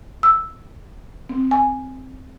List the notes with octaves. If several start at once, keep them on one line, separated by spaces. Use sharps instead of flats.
E6
C4
G#5